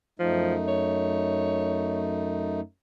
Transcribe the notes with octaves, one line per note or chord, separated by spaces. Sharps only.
F#2 F3 A3 D#4
C#5